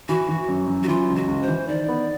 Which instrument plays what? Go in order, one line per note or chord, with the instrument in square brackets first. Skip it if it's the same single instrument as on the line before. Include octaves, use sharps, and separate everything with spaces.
[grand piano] E3 [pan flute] F#4
[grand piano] E3
F#2
F#2
[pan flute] F#4
[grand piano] E3 [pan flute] F4
[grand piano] C#2
[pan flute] F#4
[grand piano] C#2
[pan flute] C5
[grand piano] E3
[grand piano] D#3 [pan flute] D5
[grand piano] B3